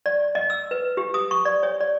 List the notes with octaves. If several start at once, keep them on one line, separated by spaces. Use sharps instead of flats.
D5
D#5
E6
B4
G4
D#6
C#6
D5
C#5
D5